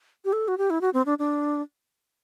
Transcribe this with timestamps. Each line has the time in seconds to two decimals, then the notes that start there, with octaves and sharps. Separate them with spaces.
0.25 G4
0.33 A4
0.48 F#4
0.58 G4
0.70 E4
0.81 F#4
0.94 C4
1.06 D4
1.19 D4